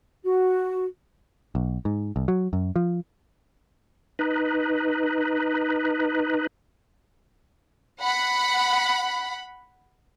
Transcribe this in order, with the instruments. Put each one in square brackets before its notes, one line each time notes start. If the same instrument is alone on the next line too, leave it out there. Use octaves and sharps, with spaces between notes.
[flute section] F#4
[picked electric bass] B1
G#2
C2
F#3
F#2
F3
[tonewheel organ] D#4 B4
[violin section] F#5 B5